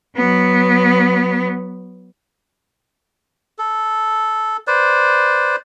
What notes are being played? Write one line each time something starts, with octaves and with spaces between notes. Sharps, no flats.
F#3 B3
A4
B4 C5 D5